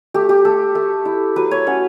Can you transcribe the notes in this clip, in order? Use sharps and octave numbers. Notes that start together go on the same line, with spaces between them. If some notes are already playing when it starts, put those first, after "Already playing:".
A3 G4
G4
A3 A4
A3
E4
F#3 B4
C#5
C#4 F#5